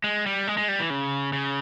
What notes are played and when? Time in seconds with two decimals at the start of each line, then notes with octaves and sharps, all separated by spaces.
0.04 G#3
0.26 G3
0.47 G#3
0.58 G#3
0.69 G3
0.79 E3
0.90 C#3
1.33 C#3